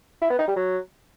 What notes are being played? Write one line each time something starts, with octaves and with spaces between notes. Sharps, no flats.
E4
B3
D#4
G3
F#3